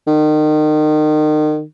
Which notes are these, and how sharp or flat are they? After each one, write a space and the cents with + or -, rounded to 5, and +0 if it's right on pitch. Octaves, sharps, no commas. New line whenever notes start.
D#3 -30